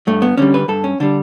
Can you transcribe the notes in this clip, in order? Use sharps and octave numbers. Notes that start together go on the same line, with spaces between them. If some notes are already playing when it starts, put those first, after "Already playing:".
G2 A3
B3
D3 G3 C#4
B4
G2 A4
C#4
D3 G3 D4